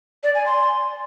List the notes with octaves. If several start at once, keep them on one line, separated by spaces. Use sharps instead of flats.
D5
G#5
C6